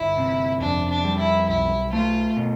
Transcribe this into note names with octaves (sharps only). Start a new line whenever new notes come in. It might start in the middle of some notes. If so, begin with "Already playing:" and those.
Already playing: G1 E4
C3
F2 D4
D4
G3
E4
B1 E4
A3 F4
B2